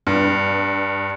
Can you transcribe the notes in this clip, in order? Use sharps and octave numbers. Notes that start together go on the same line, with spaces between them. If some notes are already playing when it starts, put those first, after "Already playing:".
G2